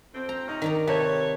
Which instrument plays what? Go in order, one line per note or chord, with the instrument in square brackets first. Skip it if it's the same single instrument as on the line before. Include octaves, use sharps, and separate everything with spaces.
[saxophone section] F2 C4
[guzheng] A#5
[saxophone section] C3 C#4 D#4
[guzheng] D#3 D5 A#5
[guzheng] C3 [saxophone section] A4 B4 C#5